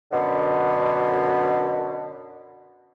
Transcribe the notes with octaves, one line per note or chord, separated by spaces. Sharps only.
F#2 B2 D3